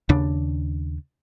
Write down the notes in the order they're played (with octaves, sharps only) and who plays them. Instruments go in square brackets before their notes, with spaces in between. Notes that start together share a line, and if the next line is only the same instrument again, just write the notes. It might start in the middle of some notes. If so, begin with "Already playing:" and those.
[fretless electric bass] D#2 C#3 D4